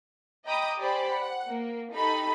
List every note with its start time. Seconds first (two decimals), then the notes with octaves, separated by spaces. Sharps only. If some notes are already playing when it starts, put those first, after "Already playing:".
0.45 D#5 G5 A#5 B5 D6 D#6
0.78 G4 C5 D5 G#5 B5
1.12 F#5
1.47 A#3
1.93 D#4 G4 A4 B5